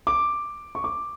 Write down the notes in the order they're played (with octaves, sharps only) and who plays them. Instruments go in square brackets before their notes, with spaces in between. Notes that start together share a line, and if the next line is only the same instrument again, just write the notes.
[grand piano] D6
C#6
D6